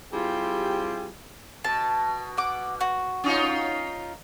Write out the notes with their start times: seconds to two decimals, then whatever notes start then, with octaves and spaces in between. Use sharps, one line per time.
0.12 G3 C4 E4 F4 G4 G#4
1.64 B2 A5
2.37 F#5 D6
2.81 F#4
3.24 C#4 D#4 F4